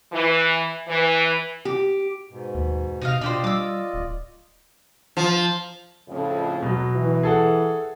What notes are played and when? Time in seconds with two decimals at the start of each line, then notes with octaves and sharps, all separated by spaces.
0.12 E3
0.88 E3
1.65 G4
2.30 G#2 B2
2.55 D#2
3.02 C3 D#4 D#5 F5
3.21 B2 D4 F4 G4 C5 D5 D#5
3.44 G3 D6 E6
3.94 D#1
5.17 F3
6.08 F2 A2 C#3
6.62 B2 F#3
6.94 E3
7.23 G#4 A4 F#5